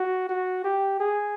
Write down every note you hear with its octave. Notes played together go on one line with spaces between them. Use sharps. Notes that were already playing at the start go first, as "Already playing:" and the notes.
Already playing: F#4
F#4
G4
G#4